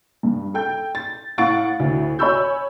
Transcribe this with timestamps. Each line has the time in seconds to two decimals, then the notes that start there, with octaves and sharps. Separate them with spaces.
0.23 G2
0.54 A4 G5 G6
0.95 A6
1.38 A2 F5 F#5 C#6 A6 D7
1.79 D2 A2
2.19 C#5 G#5 B5 C#6 E6 G6